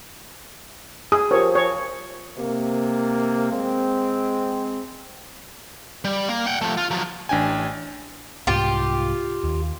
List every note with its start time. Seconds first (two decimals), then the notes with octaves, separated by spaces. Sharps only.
1.12 G#4 D#6
1.31 F3 G4 A#4 C#5
1.55 C#5
2.38 C3 A#3
3.51 G#3 C4
6.05 G3
6.29 A#3
6.46 F#5 G5
6.61 F3 A3
6.77 F4
6.91 F3 F#3
7.29 A1 D4 G5 G#5
8.47 C2 G#2 F4 G4
9.44 D#2